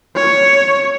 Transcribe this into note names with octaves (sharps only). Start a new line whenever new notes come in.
C#5